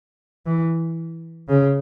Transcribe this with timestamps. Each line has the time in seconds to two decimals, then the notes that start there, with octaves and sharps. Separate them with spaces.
0.46 E3
1.49 C#3